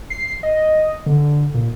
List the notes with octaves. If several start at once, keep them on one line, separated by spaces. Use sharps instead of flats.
C7
D#5
D3
A#2